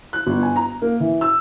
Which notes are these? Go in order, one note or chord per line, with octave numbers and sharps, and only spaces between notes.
F#6
G1
G#5
A#5
A#3
E3
E6